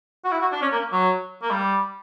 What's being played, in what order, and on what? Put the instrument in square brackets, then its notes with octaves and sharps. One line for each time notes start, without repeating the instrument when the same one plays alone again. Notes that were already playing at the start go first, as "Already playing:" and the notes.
[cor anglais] F#4
E4
F#4
D4
C#4
A#3
F#3
A#3
G3